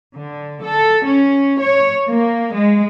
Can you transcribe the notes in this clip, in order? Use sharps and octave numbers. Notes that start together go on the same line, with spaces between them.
D3
A4
C#4
C#5
A#3
G#3